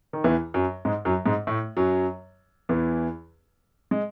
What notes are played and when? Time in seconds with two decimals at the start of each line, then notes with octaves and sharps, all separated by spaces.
0.13 D#3
0.24 E2 E3
0.54 F#2 F#3
0.85 G#2 G#3
1.05 F#2 F#3
1.26 G#2 G#3
1.47 A2 A3
1.77 F#2 F#3
2.69 E2 E3
3.91 G#3